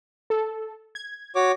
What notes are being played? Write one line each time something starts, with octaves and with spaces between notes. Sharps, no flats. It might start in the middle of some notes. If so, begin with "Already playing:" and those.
A4
G#6
F#4 C#5 D6